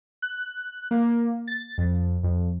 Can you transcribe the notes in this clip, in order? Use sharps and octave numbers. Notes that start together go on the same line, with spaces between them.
F#6
A#3
A6
F2
F2